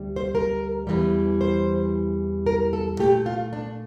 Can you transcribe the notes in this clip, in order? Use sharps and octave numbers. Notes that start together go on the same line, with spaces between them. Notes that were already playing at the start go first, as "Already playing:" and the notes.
Already playing: D2 G3
C5
A#4
E2 E3 G3
C5
A#4
A4
A#2 A3 G4
F4
D4